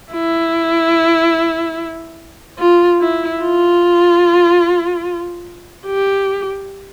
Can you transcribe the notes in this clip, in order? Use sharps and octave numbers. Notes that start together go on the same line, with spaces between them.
E4
F4
E4
F4
G4